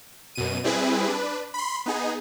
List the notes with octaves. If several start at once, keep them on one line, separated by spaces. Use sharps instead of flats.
F#2 B2 D#7
G3 C4 E4 G#4 B4
D4 B4
B5 C6
B3 D#4 G#4